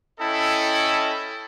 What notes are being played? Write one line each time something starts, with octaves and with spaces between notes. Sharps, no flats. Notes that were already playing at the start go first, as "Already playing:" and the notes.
C#4 E4 A4 D#5 G5 A5